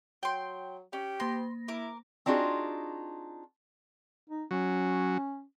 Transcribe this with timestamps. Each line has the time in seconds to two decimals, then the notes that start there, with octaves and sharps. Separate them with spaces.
0.23 F#3 G5 C6
0.93 C#4 G4
1.20 A#3 C6 A#6
1.68 E4 A#4 D6
2.26 C4 D4 D#4 F4 F#4 G#4
4.30 D#4
4.51 F#3 C#4